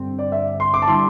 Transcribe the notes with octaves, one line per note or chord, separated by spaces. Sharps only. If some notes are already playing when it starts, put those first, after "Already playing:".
Already playing: G2 D3 C4
D5
E5
C6
D6
A5
D3 G3 E4 C6